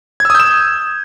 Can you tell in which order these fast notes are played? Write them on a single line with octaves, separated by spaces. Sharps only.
G#6 E6 D#6 G6 E7